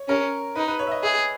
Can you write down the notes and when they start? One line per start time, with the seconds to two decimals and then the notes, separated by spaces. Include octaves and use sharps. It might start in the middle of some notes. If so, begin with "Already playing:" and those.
Already playing: C#5
0.09 C#4 A#4
0.55 D#4 B4
0.67 B4
0.79 C#5
0.87 E5
0.91 D#5
1.03 G#4 E5